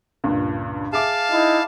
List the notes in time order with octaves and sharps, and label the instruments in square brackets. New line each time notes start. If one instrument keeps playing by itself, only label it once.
[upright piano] C#2 G2 A#2
[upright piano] G#4 E5 D6 [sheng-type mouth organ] F5 A5
[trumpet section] D#4 E4